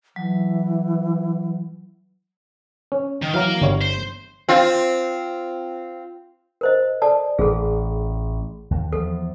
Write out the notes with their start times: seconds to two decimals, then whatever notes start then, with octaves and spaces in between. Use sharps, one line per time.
0.16 E3 F#3
2.92 C#4
3.22 D#3
3.34 E3 F#3 A#4 F5 A#5
3.61 G1 G3 C#5
3.81 C5
4.49 C4 F4
6.61 A#4 C5 D#5
7.02 A4 D5 A5
7.39 A1 G#4 A4
8.71 D#2
8.93 E2 F3 A4